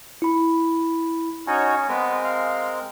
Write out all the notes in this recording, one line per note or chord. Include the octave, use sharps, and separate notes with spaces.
E4 B5
C#4 D#4 F#4 C#5 G#5
G#3 B3 C4 A#4
F5